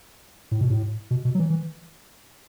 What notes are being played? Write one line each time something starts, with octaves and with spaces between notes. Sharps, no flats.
A2
B2
A2
B2
B2
F#3
E3
E3